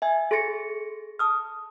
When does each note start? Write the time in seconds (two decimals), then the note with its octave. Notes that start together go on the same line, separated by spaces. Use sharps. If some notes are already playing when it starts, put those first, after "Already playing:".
0.02 E5 G#5 G#6
0.31 G#4 A4 C6 A6 A#6 C#7
1.19 A5 D#6 F6